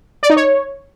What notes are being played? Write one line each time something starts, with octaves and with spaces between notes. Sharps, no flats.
D5
D#4
C#5